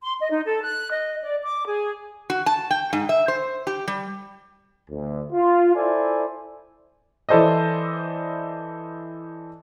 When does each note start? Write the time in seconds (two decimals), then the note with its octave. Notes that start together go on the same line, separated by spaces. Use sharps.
0.02 C6
0.19 D#5
0.31 D#4
0.45 A4
0.64 F#6
0.91 D#5
1.23 D5
1.42 D6
1.66 G#4
2.30 F#4
2.46 A5
2.71 G5
2.93 G#2
3.09 E5
3.28 C5
3.67 G4
3.88 G3
4.90 D2
5.33 F4
5.75 E4 A4 C5 D5 E5 G#5
7.29 E3 E4 A4 C5 D5 D#5